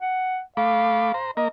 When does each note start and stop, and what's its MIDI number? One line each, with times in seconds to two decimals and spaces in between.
0.01 0.40 78
0.57 1.12 57
0.57 1.15 77
0.57 1.12 83
0.57 1.12 86
1.14 1.31 72
1.14 1.31 82
1.37 1.48 58
1.37 1.47 75
1.37 1.48 82